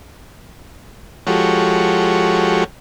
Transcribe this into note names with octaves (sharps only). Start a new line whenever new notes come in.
F3 G#3 F#4 G4 A4 C#5